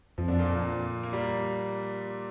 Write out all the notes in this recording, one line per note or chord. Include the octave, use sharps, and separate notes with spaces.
F2 F3
D3 D4
A#2 A#3
A#3
G3